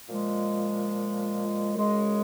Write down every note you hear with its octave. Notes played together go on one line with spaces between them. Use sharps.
A#2 F3 G#3
F#2 C#3 G#3